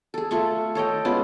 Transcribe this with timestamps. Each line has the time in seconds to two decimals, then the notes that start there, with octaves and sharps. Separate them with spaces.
0.14 G#4 A4
0.31 A3 F4 A4 C#6
0.75 A4 C#5 D#5 G5
1.05 G#3 B3 C#4 F4